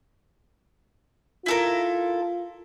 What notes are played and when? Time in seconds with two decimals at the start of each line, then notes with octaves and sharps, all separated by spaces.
1.46 E4 F4 A4 A#4